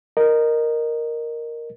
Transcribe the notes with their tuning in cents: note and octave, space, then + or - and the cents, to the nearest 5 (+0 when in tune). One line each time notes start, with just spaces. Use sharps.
A#4 +0 D#5 -20